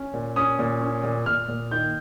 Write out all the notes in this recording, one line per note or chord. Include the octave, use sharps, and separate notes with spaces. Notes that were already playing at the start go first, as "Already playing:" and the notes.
Already playing: C#4
A#2
C#4 D#6
A#2
C#4
A#2
A#2 F6
A#2
D#3 G6